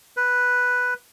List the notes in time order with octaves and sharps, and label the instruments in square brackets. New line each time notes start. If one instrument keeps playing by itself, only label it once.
[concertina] B4